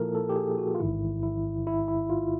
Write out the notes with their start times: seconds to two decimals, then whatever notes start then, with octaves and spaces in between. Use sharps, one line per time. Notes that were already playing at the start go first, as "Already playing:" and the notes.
Already playing: A#2 F3 A#3 E4 F4 A4 A#4
0.15 A4
0.29 G4
0.36 G#4
0.58 F#4
0.75 F4
0.79 A1 G#2 D#3 E4
1.23 E4
1.67 E4
1.88 E4
2.10 F4